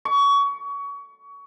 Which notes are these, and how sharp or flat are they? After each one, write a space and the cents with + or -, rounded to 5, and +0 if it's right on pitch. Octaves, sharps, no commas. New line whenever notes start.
C#6 +25